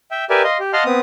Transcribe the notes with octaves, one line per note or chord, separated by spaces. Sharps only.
E5 G5
G4 A#4 B4 D5 E5 G#5
D#5 F5 C6
G4
D#5 F5 F#5 A5 C6 F6
B3 C4 D#6